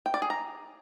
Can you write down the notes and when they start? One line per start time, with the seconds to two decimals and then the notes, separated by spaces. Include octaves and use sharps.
0.06 G5
0.14 D5
0.22 G#4
0.30 A#5